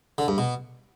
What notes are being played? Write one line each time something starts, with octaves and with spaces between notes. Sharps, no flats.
D3
G2
B2